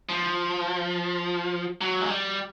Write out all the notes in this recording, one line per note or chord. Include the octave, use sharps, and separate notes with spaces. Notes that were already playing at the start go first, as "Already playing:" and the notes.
F3
F#3
G#3
G3